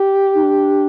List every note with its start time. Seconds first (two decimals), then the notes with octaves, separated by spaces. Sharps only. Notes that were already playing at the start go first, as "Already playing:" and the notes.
Already playing: G4
0.35 D#4
0.43 D4